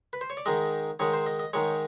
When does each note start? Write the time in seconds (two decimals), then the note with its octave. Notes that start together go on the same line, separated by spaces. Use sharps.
0.13 B4
0.21 C5
0.30 C#5
0.37 D5
0.46 G#2 D#3 G#3 D#5
0.99 G#2 D#3 G#3 C#5
1.13 C5
1.26 D#5
1.39 D#5
1.53 G#2 D#3 G#3 C#5